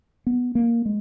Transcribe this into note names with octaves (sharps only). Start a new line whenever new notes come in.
B3
A#3
G#3